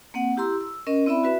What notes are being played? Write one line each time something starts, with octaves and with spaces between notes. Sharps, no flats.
A#3 C4 F#5
E4 G4 A#5 C6 E6
E6
C#4 A#4 D#5
C4 E4 D5 E5 B5
F#4 B4 E5